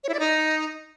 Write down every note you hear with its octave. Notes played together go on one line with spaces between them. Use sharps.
C#5
E4
D5
D#4